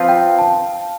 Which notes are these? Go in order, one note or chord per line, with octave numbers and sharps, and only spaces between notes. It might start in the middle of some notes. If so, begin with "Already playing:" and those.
Already playing: F3 C4 F4 B4 F5
G5
A5